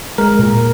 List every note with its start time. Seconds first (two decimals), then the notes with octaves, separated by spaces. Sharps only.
0.18 G#3 A#4
0.39 A#2